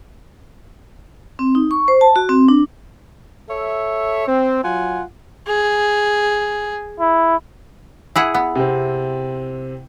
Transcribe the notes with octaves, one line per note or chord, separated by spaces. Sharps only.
C4
D#4
C#6
C5
A5
F#4
C4
D4
A4 C#5 E5
C4
F#3 F4 F#5 G#5
G#4
E4
E4 G#4 F#5
B3
C3 C4